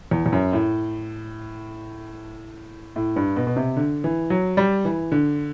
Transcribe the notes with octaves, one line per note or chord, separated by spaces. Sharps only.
E2
E2
F#2
A2
A2
G2
B2
B2
C3
D3
E3
F#3
G3
E3
D3